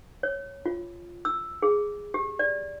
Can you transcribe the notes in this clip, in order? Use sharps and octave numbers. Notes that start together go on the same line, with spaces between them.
C#5
F4
E6
G#4
G4
D5